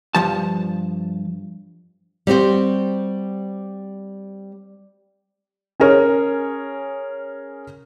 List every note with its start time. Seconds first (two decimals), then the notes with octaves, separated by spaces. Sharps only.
0.15 G2 F3 A5
2.27 G3 C4 F#4 C5
5.80 C#4 G#4 A#4 C#5